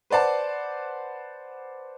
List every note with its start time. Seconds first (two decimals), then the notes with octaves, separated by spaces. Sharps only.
0.10 B4 C5 D5 F#5 A5